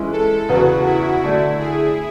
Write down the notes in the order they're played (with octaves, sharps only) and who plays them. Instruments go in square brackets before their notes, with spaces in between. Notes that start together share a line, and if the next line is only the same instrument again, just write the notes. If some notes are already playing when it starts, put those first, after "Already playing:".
Already playing: [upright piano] E3 G#3 C#4 E4 B4
[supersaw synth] A4
[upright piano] E2 C#3 E3 B3 [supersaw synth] F#4
[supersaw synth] E4
[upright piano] D3 A3 D4 [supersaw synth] E4
[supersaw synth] G#4